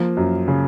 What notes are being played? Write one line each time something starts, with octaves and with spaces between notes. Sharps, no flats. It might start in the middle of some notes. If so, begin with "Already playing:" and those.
Already playing: F3 A#3
F#2
C#3